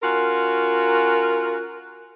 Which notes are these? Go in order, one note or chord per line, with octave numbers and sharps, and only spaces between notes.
C#4 F4 F#4 A#4